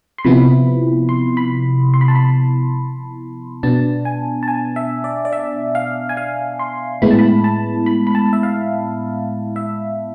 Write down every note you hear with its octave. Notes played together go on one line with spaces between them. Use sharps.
C6
C3 F3 B3 E4 B5
C6
B5
C6
B5
A5
B5
B2 B3 D4 A5
G#5
A5
G#5
E5
D5
D5
E5
F5
G#5
F5
C6
A2 G#3 B3 E4 B5
A5
B5
A5
B5
B5
A5
E5
F5
E5